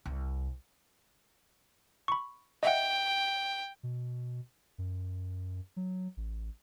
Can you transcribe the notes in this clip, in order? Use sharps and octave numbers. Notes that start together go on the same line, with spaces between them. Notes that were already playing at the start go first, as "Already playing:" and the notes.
C2
B5 C#6
D#5 E5 F#5 G5
B2
F#2
F#3
A1